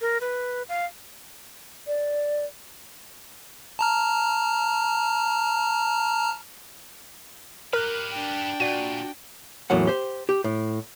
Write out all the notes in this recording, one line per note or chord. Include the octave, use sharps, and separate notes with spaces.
A#4
B4
F5
D5
A5 A#5 F6
G4 A#4 B4 F6 F#6
D4 G5
A#2 F#4 D5 D#7
E2 A2 F#3 A#3 F#5
G4 C5
G4
A2